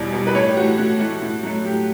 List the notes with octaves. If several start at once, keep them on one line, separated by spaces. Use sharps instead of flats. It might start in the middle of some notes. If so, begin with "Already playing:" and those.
Already playing: E2 B2 G3 D5
B2 G3
B4
A2 C#5
G4
E3 A3 F#4
A2 F#4
E3 A3
A2
F#3 A3
A2 G4